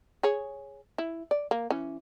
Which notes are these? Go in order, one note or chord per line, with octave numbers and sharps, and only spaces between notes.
G#4 C#5
E4
D5
A#3
E3 C#4